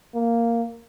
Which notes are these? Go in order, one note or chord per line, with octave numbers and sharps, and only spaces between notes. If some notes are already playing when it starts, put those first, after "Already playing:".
A#3